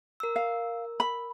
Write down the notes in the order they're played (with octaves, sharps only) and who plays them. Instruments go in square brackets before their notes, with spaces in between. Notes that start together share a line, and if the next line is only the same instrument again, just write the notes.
[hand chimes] A#4 E6
[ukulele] F5
B5